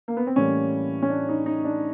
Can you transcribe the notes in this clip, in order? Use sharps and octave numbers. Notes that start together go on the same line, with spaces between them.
A#3
B3
C4
A2 E3 G3 A#3 C#4
C#4
D4
D#4
D#4
D4